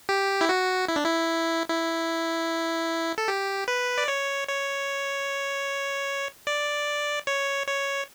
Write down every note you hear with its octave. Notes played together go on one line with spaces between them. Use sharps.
G4
E4
F#4
E4
D4
E4
E4
A4
G4
B4
D5
C#5
C#5
D5
C#5
C#5